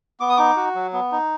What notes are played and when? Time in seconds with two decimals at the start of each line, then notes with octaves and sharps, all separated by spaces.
0.20 B3 D6
0.29 D#6
0.37 D#4 D6
0.57 F#4
0.75 F#3
0.93 B3
1.12 D#4